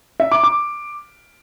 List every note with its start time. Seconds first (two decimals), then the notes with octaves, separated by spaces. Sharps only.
0.20 E5
0.32 D6
0.43 D6